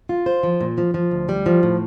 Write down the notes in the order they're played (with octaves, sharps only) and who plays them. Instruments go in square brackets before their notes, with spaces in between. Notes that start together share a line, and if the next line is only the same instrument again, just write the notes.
[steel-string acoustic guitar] F4
C5
F3
A#2
F3
F3
D2
G3
F3
A2